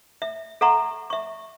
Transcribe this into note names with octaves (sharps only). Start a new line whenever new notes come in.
E5
A4 E5 F#5 A#5 C#6
E5 C#6